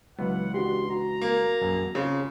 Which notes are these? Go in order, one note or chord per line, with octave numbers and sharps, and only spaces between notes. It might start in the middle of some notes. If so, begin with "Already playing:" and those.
C#2 E3 F#3 B3 F#5
D4 F#4 G4 C6
F#4 A#5
A#3
A#1 F#2
C#3 C4 F4